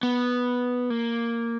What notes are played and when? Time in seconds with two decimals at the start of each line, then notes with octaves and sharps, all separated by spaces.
0.03 B3
0.90 A#3